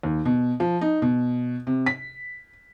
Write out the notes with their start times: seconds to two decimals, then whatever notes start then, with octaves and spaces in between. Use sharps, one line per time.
0.03 D#2
0.25 B2
0.60 F3
0.81 D#4
1.02 B2
1.67 C3
1.86 B6